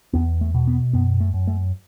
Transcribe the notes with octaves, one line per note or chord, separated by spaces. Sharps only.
E2 B3
A3
B2
B3
F#2 B3
A3
F#2
A3